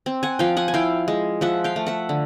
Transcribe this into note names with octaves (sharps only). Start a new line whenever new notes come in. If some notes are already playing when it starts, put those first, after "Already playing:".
C4
F#5 G#5
F3 F5 G5
F#5 G#5
G#5
E4 F5 G5
G#3
F3 E5 F#5
F5 G5
A3
E5 F#5
D3